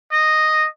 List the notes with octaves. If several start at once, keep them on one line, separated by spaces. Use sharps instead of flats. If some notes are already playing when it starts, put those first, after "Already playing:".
D#5